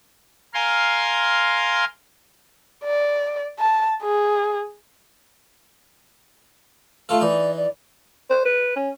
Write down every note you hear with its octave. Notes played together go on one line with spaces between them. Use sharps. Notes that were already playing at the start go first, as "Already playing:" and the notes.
A#4 F5 G#5 C6
D5
A5
G#4
A3 F4 A4 F5
E3 D#4 D5
D5
C5
B4
C#4